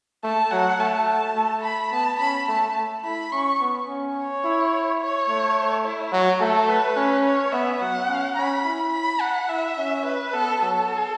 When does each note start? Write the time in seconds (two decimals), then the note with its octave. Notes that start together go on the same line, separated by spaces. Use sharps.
0.24 A3 A5
0.52 F#3 F#5
0.79 A3 A5
1.07 A5
1.36 A3
1.63 B5
1.92 B3 A5
2.19 C#4 B5
2.48 A3 A5
2.76 A3
3.04 E4 B5
3.32 C#4 C#6
3.60 B3
3.88 C#4
4.17 C#5
4.44 E4
5.01 C#5
5.29 A3
5.85 E4
6.12 F#3 F#4
6.40 A3 A4
6.69 B4
6.96 C#4
7.25 C#5
7.52 B3 E5
7.81 F#3 F#5
8.08 C#4
8.37 C#4 B5
8.65 E4
8.93 B5
9.21 F#5
9.49 E4 E5
9.77 C#4
10.06 B4
10.33 B3 A4
10.61 F#3 A4